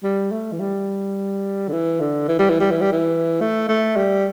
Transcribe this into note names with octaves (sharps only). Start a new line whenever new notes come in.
G3
A3
E3
G3
D3
E3
D3
E3
G3
E3
G3
E3
G3
E3
A3
A3
G3